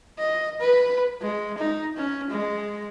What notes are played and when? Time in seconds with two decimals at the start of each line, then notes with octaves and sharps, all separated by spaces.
0.19 D#5
0.60 B4
1.21 G#3
1.58 D#4
1.96 C#4
2.30 G#3